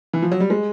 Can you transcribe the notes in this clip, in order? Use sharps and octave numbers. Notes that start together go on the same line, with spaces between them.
E3
F3
F#3
G3
G#3